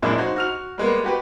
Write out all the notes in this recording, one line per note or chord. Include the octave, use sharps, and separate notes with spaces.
F#2 A#2 F3 G#3 D4 E4
D#4 F#4 C5
F#4 F6 F7
G3 G#3 A#3 B3
F#4 G4 B4